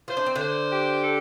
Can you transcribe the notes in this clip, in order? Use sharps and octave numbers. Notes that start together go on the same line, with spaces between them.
F4 C5
D4
C4
D3 D4 C5
G4
A4